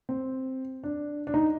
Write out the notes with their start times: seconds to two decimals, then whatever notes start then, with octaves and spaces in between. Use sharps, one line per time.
0.09 C4
0.84 D4
1.27 D4
1.34 D#4